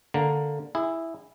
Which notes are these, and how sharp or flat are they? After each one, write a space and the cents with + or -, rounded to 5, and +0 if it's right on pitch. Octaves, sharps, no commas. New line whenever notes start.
D3 +0 A#3 +0 A#5 +0
E4 +0 G#4 -20